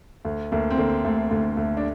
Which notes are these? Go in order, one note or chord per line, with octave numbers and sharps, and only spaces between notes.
D2
D2 A#3
C4
D3 A#3
D2 A3
D2 A3
D2
D4